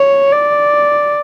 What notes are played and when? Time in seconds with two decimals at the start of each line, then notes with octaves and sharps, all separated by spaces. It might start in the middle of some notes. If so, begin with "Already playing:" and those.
Already playing: C#5
0.32 D5